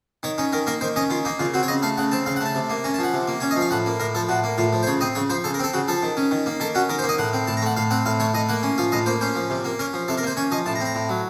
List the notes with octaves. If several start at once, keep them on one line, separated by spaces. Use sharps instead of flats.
D#3 C#5
C#4 D#4
D#3 A#4
A#3 A#4
D#3 C5
C#4 D#5
D#3 F4
A#3 D#4
C#3 F4
C4 F#4
C#5
C#3 D#5
A3 F5
C#3 F#5
C4 A5
C#3 F5
F#5
A3
A5
C3
A#3
C#4 A#5
A5
F3 F#5
C3
A#3
C#4 C#5
D#5
F3 F5
A2 F#5
A#3
A2 A#4
F3 A4
A2 F#4
A#3
A2 F4
F3
C5
C#3 C#5
C4 D#5
C#3 C#5
F3 C5
C#3 A4
A#4
C4 A4
C#3 F#4
F3 A4
D#3
C#4
D#3
A#3
D#3 A4
C#4 F#4
D#3 A#4
C5
A#3
D#5
A2 F#5
C4
A2 A5
A#5
A3 F#5
A2 F5
C4 F#5
A2 F5
A3 C#5
A2 D#5
A#3 F#5
C#4
F3 F5
A2 D#5
A#3 C5
C#4 C5
F3
C3
A#3
C#4 A#4
F3
C3 A4
A#4
A#3 C5
C#4 C#5
F3 D#5
A2 A5
A#5
C4
A#5
A2
F#3